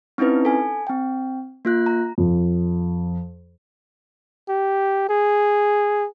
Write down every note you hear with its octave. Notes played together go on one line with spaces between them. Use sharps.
C4 C#4 D#4 E4 B4
A4 G#5
C4 G5
A#3 F4 F#6
A#5
F2
G4
G#4